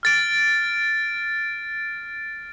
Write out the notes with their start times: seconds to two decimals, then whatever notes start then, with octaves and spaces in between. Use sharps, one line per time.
0.03 F6 A6 D7